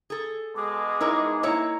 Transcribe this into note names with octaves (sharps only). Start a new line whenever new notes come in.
G#4 A4
B2 G#3 D6
D#4 E4 A#4 C#5
A#3 E4 C#5 E5 A#5